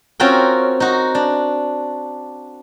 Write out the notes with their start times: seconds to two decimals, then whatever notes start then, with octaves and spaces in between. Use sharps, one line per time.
0.20 C4 C#4 F4 F#4 A#4 G5
0.80 D#4 F#4
1.15 D4